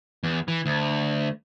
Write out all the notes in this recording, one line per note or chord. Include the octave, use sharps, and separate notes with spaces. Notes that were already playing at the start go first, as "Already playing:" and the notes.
E2
E3
D2